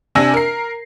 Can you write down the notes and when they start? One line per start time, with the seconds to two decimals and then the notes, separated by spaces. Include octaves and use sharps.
0.15 C3 D4 G#5 E6 A#6
0.34 A#4 C7